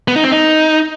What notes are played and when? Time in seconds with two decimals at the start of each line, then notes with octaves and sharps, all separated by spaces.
0.08 B3
0.16 D#4
0.24 C4
0.32 D#4